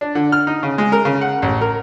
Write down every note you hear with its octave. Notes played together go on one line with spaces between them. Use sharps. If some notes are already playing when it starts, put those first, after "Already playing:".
D4
D3
F6
D#4
C#3
G#3
A#4
C#3
F#5
A1
A#4